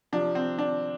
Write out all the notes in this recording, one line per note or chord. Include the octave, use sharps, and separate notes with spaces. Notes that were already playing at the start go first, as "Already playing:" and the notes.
C3 F3 D4
C4
D4